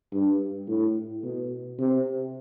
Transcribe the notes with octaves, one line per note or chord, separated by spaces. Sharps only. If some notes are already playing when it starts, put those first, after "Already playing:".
G2
A2
B2
C3